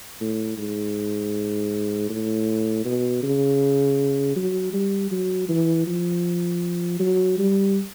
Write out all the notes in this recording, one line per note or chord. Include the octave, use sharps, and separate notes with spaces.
A2
G#2
A2
B2
C#3
F#3
G3
F#3
E3
F3
F#3
G3